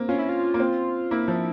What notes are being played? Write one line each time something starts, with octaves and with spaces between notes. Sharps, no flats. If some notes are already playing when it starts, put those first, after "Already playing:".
Already playing: A#3 C4
C#4 F4
E4
F4
A#3
C4
A#3 E4
F3